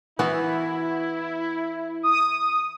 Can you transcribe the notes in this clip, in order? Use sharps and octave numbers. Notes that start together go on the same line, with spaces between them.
E3 B3 E4 F#4
D#6